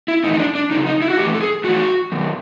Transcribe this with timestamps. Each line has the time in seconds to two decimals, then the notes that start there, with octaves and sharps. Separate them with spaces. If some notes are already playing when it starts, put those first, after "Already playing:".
0.08 E4
0.24 A2 E3 D#4
0.34 D#4
0.39 D4
0.55 D4
0.71 F#2 C#3 D#4
0.86 D#4
1.02 E4
1.10 F#4
1.17 A2 E3 G4
1.34 A4
1.41 G#4
1.64 A2 E3 F#4
2.12 F#2 D#3